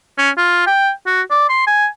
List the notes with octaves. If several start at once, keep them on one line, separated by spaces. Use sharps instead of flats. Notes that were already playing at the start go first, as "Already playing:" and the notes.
C#4
F4
G5
F#4
D5
C6
G#5